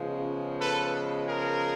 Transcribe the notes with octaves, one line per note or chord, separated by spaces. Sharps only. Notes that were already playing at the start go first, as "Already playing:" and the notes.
Already playing: C#3 F3 G#3 B3
A4 B4
G#4 A#4